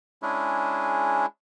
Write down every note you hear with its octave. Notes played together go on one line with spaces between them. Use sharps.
G#3 C#4 D4 E4 G#4